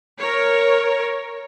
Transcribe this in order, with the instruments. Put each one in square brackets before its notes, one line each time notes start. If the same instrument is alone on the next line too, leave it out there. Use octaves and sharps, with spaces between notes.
[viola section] A#4 C#5